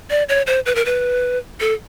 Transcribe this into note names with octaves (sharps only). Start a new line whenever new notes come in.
D5
C#5
C5
B4
A#4
B4
A4